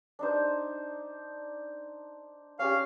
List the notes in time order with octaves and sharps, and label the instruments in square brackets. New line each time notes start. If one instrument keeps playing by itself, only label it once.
[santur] D4 D#4 C5
[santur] C#4 G4 G#4 [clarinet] F5